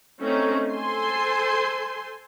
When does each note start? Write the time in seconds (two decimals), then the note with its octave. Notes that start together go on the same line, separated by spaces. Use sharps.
0.19 A3 C4 C#4 D#4
0.71 A4 C5 G#5 C6